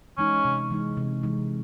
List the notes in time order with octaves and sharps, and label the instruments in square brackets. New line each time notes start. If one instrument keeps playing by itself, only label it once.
[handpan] E3 G#3 D#4 [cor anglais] C#4
[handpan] C3
E3 G#3 D#4
C3
E3 G#3 D#4